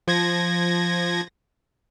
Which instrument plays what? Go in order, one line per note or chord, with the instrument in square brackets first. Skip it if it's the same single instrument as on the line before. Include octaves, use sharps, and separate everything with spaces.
[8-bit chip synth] F3 G#6 A#6